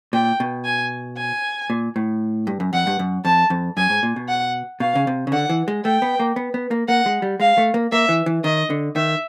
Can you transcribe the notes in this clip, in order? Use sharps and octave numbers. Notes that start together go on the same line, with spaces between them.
A#2 G5
B2
G#5
G#5
A#2
A2
G2
F#2
F2 F#5
G2
F#2
F2 A5
F2
F#2 G#5
G#2
A#2
B2
F#5
B2 F5
C#3
C3
C#3
D3 F#5
E3
G#3
A3 G5
B3
A#3
B3
B3
A#3
A#3 F#5
G#3
G3
G#3 F5
A3
A#3
A#3 E5
E3
E3
D#3 D#5
D3
D#3 E5